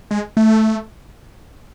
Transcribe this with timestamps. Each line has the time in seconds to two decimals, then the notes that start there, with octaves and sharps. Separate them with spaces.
0.11 G#3
0.37 A3